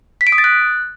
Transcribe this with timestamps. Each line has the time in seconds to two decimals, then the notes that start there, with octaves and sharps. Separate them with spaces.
0.21 B6
0.27 D7
0.32 D#6
0.38 A6
0.44 F#6